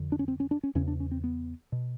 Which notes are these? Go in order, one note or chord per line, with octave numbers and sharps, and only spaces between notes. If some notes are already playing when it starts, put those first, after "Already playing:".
Already playing: F2 D3
D4
C#4
C4
C#4
D4
C#4
E2 C#3 C#4
D4
C#4
C4
B3
B2